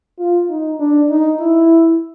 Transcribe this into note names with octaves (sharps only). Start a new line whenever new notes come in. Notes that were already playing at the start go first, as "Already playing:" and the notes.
F4
D#4
D4
D#4
E4